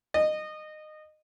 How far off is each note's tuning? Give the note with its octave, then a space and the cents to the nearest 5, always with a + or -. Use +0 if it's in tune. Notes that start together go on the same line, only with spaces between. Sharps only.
D#5 -20